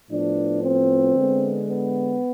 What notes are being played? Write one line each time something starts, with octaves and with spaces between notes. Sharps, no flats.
A2 F3 B3 D4
C4
D3 G#3 B3
B3